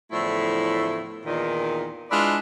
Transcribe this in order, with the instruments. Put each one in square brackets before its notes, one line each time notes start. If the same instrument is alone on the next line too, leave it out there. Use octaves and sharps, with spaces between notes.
[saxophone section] E2 A2 D3 F3 A3 E4
E2 A#2 D#3
G#3 D4 E4 F4 B4 D5